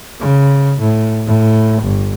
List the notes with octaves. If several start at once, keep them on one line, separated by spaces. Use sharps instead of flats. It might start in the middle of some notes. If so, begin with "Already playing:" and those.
C#3
A2
A2
G1